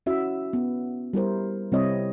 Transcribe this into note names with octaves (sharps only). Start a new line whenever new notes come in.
C#4 E4 F#4 E5
B3
G3 E4 A#4 C5
C3 G3 C4 E4 C#5 D#5